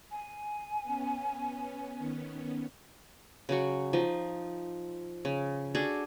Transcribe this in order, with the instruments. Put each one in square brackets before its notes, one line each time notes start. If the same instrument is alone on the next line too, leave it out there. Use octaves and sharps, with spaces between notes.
[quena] G#5
[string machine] B3 C#4
D#3 B3 C#4
[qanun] C#3 F#3 F#4
F3 D#4
C#3
D4 F#4 G#4 A4